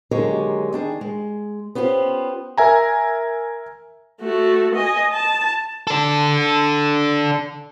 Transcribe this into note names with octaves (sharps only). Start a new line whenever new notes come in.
D#2 D3 F#3 G#3 A#4 C#5
D#3 D4 G#4
G#3
B3 C#4 F4 G4 C5
A#4 E5 G#5 A#5
A3 F#4
D#5 G#5
A5
D4 A4